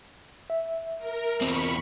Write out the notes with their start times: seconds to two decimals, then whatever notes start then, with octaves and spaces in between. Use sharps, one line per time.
0.50 E5
0.99 A#4
1.41 E2 C4 B5 C#6